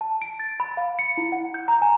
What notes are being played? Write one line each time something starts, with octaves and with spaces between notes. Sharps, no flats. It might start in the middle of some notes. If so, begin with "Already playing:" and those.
A5
D7
A6
B5
F5
C#7
E4
F#5
G6
A#5
G#5